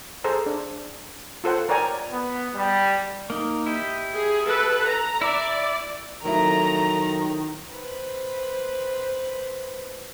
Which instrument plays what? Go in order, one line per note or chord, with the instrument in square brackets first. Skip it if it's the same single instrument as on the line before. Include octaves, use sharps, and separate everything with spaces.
[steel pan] G#4 A4 C5 A#5
D4
F4 A4 C5 F#5
A#4 C#5 D5 G5 G#5 A#5
[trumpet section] B3
G3
[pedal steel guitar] A#3 D#4
E4 G4 D#5
[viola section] G#4
A4 B4
A#5
[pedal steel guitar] E4 E5 [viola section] D5
[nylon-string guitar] F2 F#3 E4 [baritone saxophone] D#3 [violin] A3 A#6 [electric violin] A#5
[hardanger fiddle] B4 C5